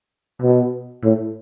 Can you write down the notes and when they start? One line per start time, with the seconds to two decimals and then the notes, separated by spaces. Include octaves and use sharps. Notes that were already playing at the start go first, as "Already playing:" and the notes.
0.42 B2
1.04 A2